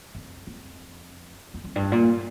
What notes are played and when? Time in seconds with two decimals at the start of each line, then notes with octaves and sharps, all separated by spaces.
0.15 F2
0.47 F2
1.54 F2
1.64 F2
1.76 G2
1.92 A#2